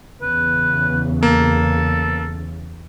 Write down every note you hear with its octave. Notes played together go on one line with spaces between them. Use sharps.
E2 C#3 B4
A#3 A4